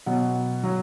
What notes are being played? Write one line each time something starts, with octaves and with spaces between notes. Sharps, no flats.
B2 F#3 F#5
F#3